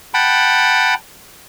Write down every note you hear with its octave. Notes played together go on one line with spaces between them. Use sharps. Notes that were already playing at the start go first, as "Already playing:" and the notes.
F#5 G5 A5 B5